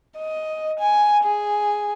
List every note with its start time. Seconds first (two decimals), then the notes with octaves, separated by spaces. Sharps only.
0.18 D#5
0.79 G#5
1.24 G#4